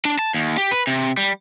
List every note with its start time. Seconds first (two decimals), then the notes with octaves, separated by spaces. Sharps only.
0.05 D4
0.19 A5
0.34 D#2
0.58 G4
0.71 B4
0.87 C3
1.17 G3